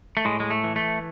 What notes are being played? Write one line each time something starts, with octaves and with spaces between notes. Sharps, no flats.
A3
A2 G#3
G#3
A3
E3
A3